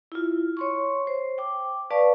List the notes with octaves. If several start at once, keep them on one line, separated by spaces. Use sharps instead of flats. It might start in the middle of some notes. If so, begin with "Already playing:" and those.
E4 F4
C#5 C6 C#6
C5
G5 D6
B4 D5 F5 A5 C#6